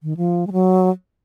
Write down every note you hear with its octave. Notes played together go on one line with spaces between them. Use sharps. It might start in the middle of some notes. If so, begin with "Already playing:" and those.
D#3
F3
G#3
F#3